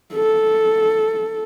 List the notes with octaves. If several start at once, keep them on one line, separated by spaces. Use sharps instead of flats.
A4